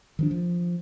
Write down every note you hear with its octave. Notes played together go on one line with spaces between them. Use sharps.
D#3 F3 D4
F3